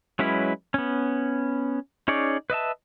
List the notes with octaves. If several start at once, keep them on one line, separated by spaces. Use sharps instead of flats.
F#3 G#3 C#4 E4 B4
B3 C#4
C#4 D#4 G#4 C#5 D5
B4 D#5 E5 A5